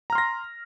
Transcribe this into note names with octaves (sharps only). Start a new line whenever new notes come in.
A#5 C6 F6 A#6